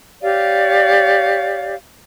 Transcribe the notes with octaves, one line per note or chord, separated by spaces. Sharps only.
G4 C#5 D5 F5